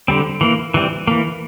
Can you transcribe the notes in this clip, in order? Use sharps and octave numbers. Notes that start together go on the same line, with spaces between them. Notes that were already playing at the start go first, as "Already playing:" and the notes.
D3 G3 C4
E3 A#3
E3 G3 C4
E3 A#3